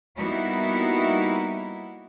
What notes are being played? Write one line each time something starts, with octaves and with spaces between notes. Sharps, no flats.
G3 A#3 B3 D#4 E4 F#4